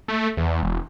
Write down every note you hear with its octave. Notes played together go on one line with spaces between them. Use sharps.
A3
E2
E1